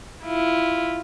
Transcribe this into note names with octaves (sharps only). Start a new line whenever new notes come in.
E4 F4